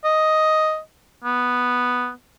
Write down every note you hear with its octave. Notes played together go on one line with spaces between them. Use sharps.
D#5
B3